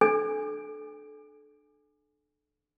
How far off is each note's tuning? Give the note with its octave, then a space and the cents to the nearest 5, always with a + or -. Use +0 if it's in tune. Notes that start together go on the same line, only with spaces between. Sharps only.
D4 +30 A4 -25 G#5 -5